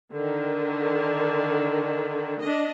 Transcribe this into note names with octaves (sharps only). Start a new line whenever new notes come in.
D3 D#3
D4 D#5